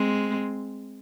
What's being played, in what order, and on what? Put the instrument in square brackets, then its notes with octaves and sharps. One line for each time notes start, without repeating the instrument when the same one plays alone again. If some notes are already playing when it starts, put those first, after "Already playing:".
Already playing: [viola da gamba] G#3 C4